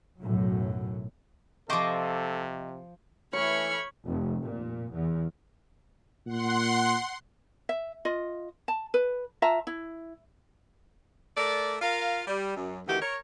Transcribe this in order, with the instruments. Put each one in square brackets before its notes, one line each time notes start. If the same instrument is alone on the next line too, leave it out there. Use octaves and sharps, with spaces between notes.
[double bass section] B1 F#2 A2 F#3
[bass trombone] C3 [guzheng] F3 C5 [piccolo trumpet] A4 [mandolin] D#5 C#6 D6
[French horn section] E3 A3 [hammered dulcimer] C#5 [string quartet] B5 F6 G#6 [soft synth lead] C#7
[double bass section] F1
A#2
E2
[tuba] A#2 [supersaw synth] F#5 C6
[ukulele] E5
F4 D#5
A5
B4
F4 E5 A5 A#5
E4
[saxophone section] A3 A#4 D5
F4 A#4 F5
G3
F#2
D2 D#3 E3 F#4 G4
A#4 C#5